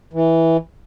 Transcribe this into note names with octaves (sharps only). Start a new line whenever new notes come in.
E3